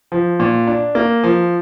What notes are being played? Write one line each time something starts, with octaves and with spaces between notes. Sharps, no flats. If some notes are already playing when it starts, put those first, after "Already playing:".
F3
A#2
D4
A#3
F3